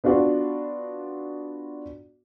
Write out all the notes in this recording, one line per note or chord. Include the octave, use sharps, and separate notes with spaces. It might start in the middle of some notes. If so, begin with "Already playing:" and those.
B3 D4 F4 F#4